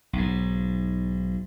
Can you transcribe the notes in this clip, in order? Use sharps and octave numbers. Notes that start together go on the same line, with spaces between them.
B1 G#2